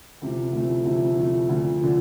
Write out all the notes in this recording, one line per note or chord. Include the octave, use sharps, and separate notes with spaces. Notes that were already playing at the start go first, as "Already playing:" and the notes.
D2 C3 F3 A3 E4
D2 C3 F3 A3 E4
D2 C3 F3 A3 E4
D2 C3 F3 A3 E4
D2 D3 F3
D3 F3